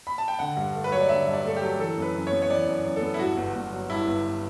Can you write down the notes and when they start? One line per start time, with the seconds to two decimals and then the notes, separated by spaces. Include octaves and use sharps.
0.07 B5
0.18 A5
0.28 G5
0.39 D3 F#5
0.57 G2
0.75 A3
0.84 B4
0.92 F#3 C#5
1.01 D5
1.09 D3 E5
1.27 G2
1.33 D5
1.44 A3 A4
1.57 G4
1.62 F#3
1.79 E3 A4
1.97 F#2 B4
2.15 F#2
2.27 C#5
2.32 B3
2.42 C#5
2.50 E3 D5
2.67 F#2
2.85 F#2
2.96 A4
3.02 B3
3.14 E4
3.19 G2 F#4
3.37 G1
3.55 G1
3.73 F#3
3.90 G2 E4
4.07 G1